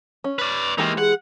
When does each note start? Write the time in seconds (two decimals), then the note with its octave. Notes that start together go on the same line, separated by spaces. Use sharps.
0.24 C#4
0.39 B4 D5
0.78 E3 G#3 A#3 D#4 G4
0.98 G#4 F#5